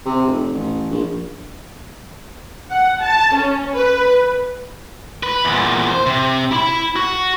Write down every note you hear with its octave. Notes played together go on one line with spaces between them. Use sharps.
C3
F1
A1
A#1
F#5
A5
C#4
B4
B4
E2 A#2
C5
C3
E4 B5
F#4